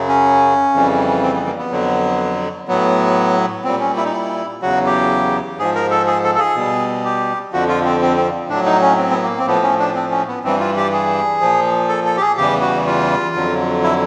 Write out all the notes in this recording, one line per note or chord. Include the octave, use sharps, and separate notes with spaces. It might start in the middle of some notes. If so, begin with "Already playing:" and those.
Already playing: F#2 C#3 F#3
C#4
F2 C#3 E3 G3
C4
B3
A#3
B3
F2 D3 F#3
A2 F#3 B3
A#2 G3 C4
C#4
E4
D#4
E4
E2 C#3 F#3 F#4
G4
G#2 F3 G#4
A#4
A4
G#4
A4
A4
G#4
B2 G3
G4
F2 D3 F3 F#4
F4
C4
C4
C4
A2 D4
F#3
D#4
C#4
C4
B3
A#3
C4
A2 F3 B3
C#4
D4
C4
C#4
B3
G2 E3 G3 C4
F4
G4
G#4
A#2 F3
A4
A4
G4
G#4
E2 C#3 E3 G3 G4
F#4
F4
F2 D3 F#3
E4